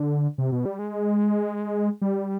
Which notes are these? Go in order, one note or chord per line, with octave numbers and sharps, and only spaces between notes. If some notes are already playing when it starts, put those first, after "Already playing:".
Already playing: D3
C3
B2
G3
G#3
G3